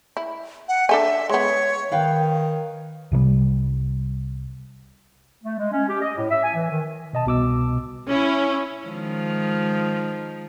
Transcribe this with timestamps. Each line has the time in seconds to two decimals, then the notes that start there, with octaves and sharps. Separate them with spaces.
0.17 E4
0.68 F#5
0.89 D4 A4 E5 G#5
1.29 G#3 B3 C#5
1.92 D#3 B4 F5 G5
3.12 C2 C3 D#3 G3
5.43 A3
5.58 G#3
5.72 C#4
5.88 G4
6.02 D#5
6.17 A2
6.30 E5
6.43 G#5
6.55 E3
6.69 D#3
7.13 B2 D#5 A5
7.26 C2 B2 D6 E6
8.08 C#4 E4
8.84 D#3 F3 G#3